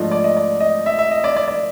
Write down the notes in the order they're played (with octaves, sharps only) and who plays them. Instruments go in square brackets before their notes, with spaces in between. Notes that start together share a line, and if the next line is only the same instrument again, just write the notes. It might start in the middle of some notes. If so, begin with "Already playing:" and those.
Already playing: [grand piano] G#2 F3 A3 D4 F4 D#5
D5
D#5
D5
D#5
E5
E5
D#5
D5
D5
D5